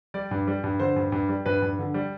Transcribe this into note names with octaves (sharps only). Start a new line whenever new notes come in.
G3 D5
G2
G3
G2
D3 C5
G2
G2
G3
G2 B4
G2
D3
G3